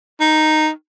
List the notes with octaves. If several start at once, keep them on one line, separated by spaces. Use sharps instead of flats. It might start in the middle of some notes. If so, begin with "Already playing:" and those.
D#4